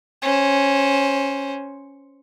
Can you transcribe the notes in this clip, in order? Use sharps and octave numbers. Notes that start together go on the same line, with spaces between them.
C#4 C5